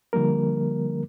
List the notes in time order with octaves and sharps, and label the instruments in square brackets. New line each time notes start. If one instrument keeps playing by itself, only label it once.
[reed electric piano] D3 F3 G3 A#3 A#4